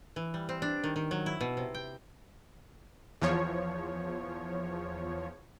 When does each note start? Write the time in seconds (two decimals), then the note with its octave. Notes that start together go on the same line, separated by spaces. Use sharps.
0.16 E3
0.34 G3
0.49 C4
0.62 D4
0.84 D#3
0.96 D#3
1.11 F#3
1.26 E4
1.41 B2
1.57 C3
1.74 G5
3.21 E2 F3 C#5